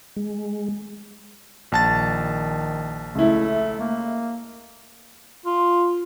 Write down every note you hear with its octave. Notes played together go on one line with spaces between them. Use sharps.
G#3
A#1 D#3 A5 A6
C#2 A3 E4
A#3
F4